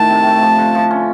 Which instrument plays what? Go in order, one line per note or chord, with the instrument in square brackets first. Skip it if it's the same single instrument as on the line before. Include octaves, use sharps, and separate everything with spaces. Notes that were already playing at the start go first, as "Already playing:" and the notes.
Already playing: [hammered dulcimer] A2 D#3 A3 [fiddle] A5
[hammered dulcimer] C3
A3
F3
D3
F3
C#4